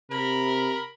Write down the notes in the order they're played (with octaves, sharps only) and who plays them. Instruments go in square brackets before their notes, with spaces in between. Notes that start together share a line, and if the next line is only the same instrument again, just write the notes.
[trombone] C3 [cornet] A#4 [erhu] B5